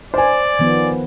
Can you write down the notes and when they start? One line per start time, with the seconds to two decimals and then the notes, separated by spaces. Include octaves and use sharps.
0.14 C5 D5 G#5
0.59 D#3 F3 B3